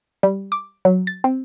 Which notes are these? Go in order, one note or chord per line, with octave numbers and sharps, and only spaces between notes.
G3
D6
F#3
A6
C4